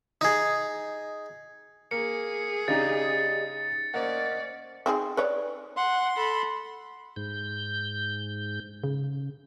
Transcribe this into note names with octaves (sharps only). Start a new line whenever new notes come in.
D#4 G#4
A#3 G#4 C#7
C#3 D#4 G4 D5 D#5 A6
A#3 C#4 C5 D5 D#5 F#5
C4 D#4 G#4
B4 C#5 D5
F#5 C6
A4 B5
G#2 G6
C#3